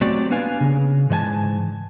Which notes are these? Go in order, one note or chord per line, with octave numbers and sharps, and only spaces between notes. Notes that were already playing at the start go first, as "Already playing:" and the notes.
F#3 A3 C4 F#4 G4 D5
A#3 B3 D4 B4 F5 G#5
C#3
G#2 E3 D#5 G#5 A5